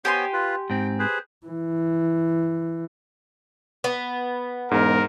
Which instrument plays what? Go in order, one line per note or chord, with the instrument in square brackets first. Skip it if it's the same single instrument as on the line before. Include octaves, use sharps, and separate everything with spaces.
[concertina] B3 C5 C#5 [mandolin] G4 G#5 C6
[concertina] F4 B4
[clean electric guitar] G#2 C4 [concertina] G5
[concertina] G#4 B4 C5
[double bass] E3
[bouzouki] B3
[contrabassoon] E1 [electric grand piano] G#2 [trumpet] A#4